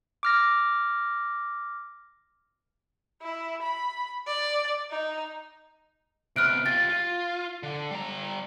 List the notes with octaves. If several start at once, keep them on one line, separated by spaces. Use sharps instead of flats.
D6 F6 A#6
E4
B5
D5
D#4
C3 B3 F6 F#6 D7
F4 G4 A6
F4
D3
G3 A#5